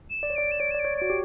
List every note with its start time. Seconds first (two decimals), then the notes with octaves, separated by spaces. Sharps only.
0.10 E7
0.23 D5
0.30 C#5
0.36 D5 D7
0.51 E7
0.60 C#5 D7
0.71 E7
0.75 D5 D7
0.85 C#5
0.98 F#4 D7
1.10 G4